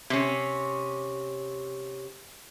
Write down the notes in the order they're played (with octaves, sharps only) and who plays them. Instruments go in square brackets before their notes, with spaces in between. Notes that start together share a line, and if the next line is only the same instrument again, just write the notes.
[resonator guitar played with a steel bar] C3 C#4